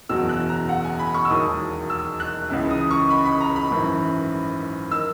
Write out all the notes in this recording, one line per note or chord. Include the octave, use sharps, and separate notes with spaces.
F#1 E2 B2 F#3 E6
F#6
A#5
F#5
G#5
B5
C#6
E6
E1 D#2 D#3 F#3 D#6
E6
F#6
C#2 C#3 E3
D#6
C#6
B5
B5
A#5
B5
G#1 F#2 E3
D#3 E6